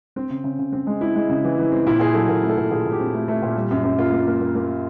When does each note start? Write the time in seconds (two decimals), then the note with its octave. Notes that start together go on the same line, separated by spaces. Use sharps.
0.16 C4
0.30 C#3
0.44 C#3
0.59 C#3
0.72 C4
0.87 G#3
1.01 C4 E4
1.15 G#3
1.29 C#3
1.44 E3
1.57 E3
1.72 C4
1.87 A#2 E4
2.00 A#2 G#4
2.14 F#3 A4
2.29 A#2 A#4
2.43 A3
2.50 A4
2.57 A#2
2.71 A#2 G#4
2.85 A#2
2.92 G4
2.99 C4
3.14 A3
3.28 A3
3.42 A#2
3.56 G3
3.71 F#2
3.84 F#2
3.98 A#3 F4
4.12 A#3
4.20 F4
4.27 A#3
4.41 A#3
4.55 A#3